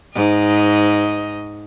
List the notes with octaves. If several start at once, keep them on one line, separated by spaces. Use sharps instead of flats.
G#2 D#5